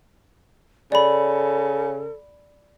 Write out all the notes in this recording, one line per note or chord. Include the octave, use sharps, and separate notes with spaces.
C#3 A4 D5 B5